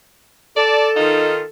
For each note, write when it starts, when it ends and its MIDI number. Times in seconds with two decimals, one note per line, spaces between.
0.57 1.49 69
0.57 0.90 74
0.57 0.90 81
0.97 1.41 51
0.97 1.41 63
0.97 1.41 65